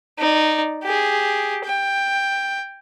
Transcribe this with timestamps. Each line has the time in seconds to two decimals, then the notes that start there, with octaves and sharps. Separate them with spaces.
0.19 D#4 D5
0.83 G4 G#4
1.64 G5